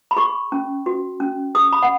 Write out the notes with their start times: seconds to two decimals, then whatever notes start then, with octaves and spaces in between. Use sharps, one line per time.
0.11 B5
0.17 G#4 C#6
0.52 C#4
0.86 F#4
1.20 C#4
1.55 G#4 D#6
1.72 B5
1.83 F#5